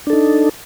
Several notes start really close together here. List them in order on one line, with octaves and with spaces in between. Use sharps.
D4 A4 D#4